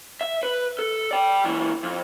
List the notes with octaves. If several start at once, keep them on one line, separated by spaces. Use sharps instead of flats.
E5
B4
A4
D5 G5
C#2 E3
F2